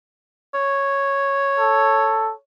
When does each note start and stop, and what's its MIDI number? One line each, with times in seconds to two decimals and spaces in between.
0.54 2.40 73
1.59 2.33 69